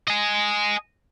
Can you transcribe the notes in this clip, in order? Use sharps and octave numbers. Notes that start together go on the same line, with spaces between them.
D#5 G#5